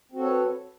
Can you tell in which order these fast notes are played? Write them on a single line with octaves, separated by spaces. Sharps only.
C4 F#4 A4 C#5 B4